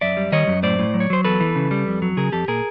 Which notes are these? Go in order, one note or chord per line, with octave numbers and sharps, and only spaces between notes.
F#2 D5 E5
G3
D#3 C#5 D#5
F#2
A2 C5 D5
A2
F#3
C#5
F#3 C5
E2 A4 B4
E3
C#3
G3
F2
F#3
C#3 G#4 A#4
F2 G4 A4
A#2 G#4 A#4